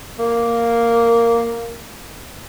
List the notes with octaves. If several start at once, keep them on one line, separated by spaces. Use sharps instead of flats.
A#3